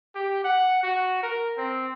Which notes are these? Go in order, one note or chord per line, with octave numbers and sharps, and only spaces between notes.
G4
F#5
F#4
A#4
C4